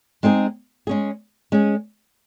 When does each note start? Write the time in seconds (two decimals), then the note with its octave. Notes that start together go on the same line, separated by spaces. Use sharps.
0.23 G#3 C4 D#4 G#4
0.87 G#3 C#4 G#4
1.52 G#3 C#4 G#4